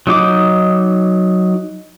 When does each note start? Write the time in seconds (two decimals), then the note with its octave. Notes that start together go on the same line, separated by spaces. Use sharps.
0.07 F#3 D#4 D6